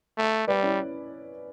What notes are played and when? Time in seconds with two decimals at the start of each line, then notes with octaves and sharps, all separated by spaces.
0.18 A3
0.47 G3 B4 D5
0.63 C#4 E4